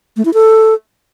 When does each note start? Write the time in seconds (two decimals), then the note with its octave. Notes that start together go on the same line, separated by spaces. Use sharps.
0.17 A3
0.25 E4
0.34 A4